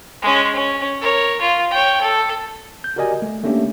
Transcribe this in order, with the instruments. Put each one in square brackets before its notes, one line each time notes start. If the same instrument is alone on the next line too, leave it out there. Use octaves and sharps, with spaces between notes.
[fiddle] G#3 C#4
C#4
A#4 C#5
F4
C#5 G5
A4
[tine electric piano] G6
F#4 G4 A#4 D5 D#5 G#5
A3
A3 A#3 C#4 D4 G4 E5